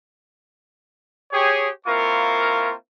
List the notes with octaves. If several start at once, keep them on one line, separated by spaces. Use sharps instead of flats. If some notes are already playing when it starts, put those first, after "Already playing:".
G4 G#4 C#5
A#3 C4 E4 F4 A#4 C#6